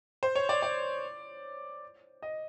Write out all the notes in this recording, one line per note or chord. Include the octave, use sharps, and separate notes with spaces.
C5
C#5
D5
D5
D#5